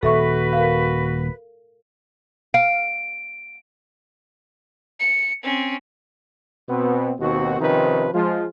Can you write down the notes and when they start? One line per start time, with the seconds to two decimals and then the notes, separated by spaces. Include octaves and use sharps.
0.03 D#1 F#4 A4 B4 E5 C#6
0.53 A#4 F5
2.54 F5 D7
5.00 C#7
5.43 C4 C#4
6.69 B2 B3 C4
7.20 D#2 B2 D#3 C4 F#4
7.59 C3 D#3 F3 C#4 D#4 B4
8.14 F3 G#3 F4